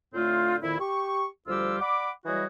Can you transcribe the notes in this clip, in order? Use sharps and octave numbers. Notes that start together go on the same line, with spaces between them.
A2 D3 A3 C4 F4
F2 A#2 D#3 E4
G4 C#6
D2 F3 G3 F4 G4 E6
D5 F#5 B5 D6
E3 F#3 G3 F#4 G#4 D#5